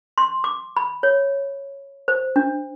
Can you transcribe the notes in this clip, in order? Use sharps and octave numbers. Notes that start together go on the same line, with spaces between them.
C6
D6
B5
C#5
C5
D4